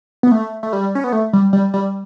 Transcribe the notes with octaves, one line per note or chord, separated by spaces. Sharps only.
B3
A3
A3
G3
C#4
B3
A3
G3
G3
G3